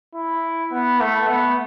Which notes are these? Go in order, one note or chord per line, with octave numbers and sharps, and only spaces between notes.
E4
B3
A3
B3